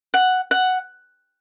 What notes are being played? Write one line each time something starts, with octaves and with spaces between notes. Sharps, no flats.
F#5
F#5